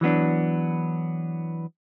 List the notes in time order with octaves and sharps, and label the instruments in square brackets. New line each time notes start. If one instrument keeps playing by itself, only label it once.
[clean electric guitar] E3 F#3 B3 D4